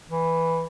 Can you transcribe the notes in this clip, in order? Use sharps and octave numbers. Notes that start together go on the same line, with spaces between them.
E3